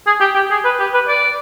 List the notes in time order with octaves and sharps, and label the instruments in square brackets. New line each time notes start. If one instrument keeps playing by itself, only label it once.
[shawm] G#4
G4
G4
G#4
B4
G4
B4
D5